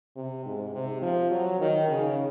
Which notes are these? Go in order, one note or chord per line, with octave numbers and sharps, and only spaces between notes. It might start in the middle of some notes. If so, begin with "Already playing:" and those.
C3
G#2
C3
F3
F#3
D#3
C#3